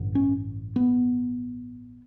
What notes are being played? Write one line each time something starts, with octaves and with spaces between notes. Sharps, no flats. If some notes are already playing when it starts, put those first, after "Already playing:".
Already playing: A1 G2 D3
C#4
B3